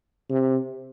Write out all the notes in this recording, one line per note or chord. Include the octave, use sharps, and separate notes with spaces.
C3